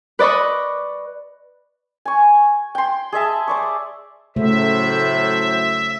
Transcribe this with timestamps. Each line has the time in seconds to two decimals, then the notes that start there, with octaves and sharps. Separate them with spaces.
0.19 B4 D5 D#5 B5 C#6
2.05 G#5 C#6
2.75 G5 C6
3.12 G#4 D#5 E5 A5
3.48 C5 D5 C#6
4.36 A2 C#3 F#3 A3 C5 E5